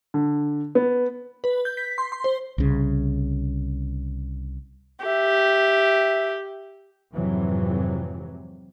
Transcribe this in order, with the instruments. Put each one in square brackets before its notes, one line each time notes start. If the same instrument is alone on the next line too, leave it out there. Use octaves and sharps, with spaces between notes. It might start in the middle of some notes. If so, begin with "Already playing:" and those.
[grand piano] D3
B3
[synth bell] B4
G6
B6
C6
C6
C5
[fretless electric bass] C2 C#3
[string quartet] G4 [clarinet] E5
[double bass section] F2 G#2 C3 E3 F#3